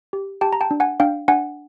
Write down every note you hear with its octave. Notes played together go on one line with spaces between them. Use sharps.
G4
G4 G5 A5
A#5
G5 A5
D4
F#5 G#5
D4 F5 G5
D4 F#5 G#5